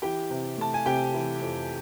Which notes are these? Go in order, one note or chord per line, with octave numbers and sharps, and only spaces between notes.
E3 G4 G5
C3
A3 A5
G#5
C3 G4 G5
E3
F2